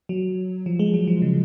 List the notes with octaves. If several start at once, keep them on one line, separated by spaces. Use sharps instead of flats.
F#3
F3
G#3
F#3
F3
C#3